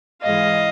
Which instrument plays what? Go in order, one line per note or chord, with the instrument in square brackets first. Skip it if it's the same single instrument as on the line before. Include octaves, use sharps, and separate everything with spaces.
[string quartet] G#2 E3 G#3 D#5 F5